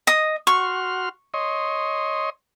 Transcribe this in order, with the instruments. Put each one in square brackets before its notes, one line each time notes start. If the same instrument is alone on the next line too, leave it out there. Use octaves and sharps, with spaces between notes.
[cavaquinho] D#5 D#6
[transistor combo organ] F#4 C6 F6 [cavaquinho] C#6
[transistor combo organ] C#5 D#5 C6